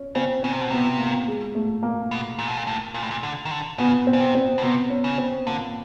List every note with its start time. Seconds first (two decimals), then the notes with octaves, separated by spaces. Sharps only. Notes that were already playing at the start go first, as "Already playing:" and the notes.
Already playing: C#4
0.15 C#3 C4
0.43 C#3 C4
0.53 C3
0.61 B2
0.70 C3 B3
0.99 A#3
1.28 G#3
1.55 A3
1.83 A#3
2.11 B2
2.39 A#2
2.47 B2
2.57 A#2
2.67 A2
2.94 A#2
3.03 A2
3.11 A#2
3.23 D3
3.45 D#3
3.51 D3
3.78 C#3 B3
4.07 C4
4.13 C#3
4.20 C3
4.35 C4
4.58 B2
4.62 C3 B3
4.90 C#4
5.04 C#3
5.18 C4
5.46 D3 A#3